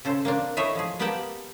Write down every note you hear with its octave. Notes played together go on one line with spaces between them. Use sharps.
C#3 A4 C5
A#3 C4 D4
A3 E4 G#4 C#5 D#5 E5
F3 G#4
A#3 B3 G4 F#5 G5 A5